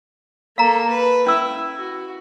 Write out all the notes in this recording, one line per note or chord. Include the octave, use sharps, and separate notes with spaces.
A#3 A4 F5 A#5
B4
C#4 E4 E6
F#4